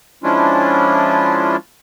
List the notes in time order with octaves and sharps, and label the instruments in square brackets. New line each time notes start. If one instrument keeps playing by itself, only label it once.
[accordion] F3 G#3 C#4 D4 E4 F4